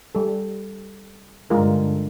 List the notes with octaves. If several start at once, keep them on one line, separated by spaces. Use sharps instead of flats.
G3 A4
G2 D3 G#3 F4 A#4